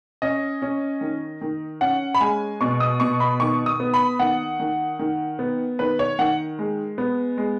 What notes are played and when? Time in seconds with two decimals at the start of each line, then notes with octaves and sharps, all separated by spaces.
0.22 C#4 D#5
0.62 C#4
1.01 D#3
1.41 D#3
1.81 C#4 F#5
2.15 B5
2.20 G#3 G#5
2.61 B2 C#6
2.80 D#6
3.00 B2 C#6
3.20 B5
3.40 D#3 C#6
3.66 D#6
3.80 B3
3.94 B5
4.19 D#3 F#5
4.60 D#3
4.99 D#3
5.39 B3
5.79 D#3 B4
5.99 C#5
6.19 D#3 F#5
6.59 G#3
6.98 B3
7.38 G#3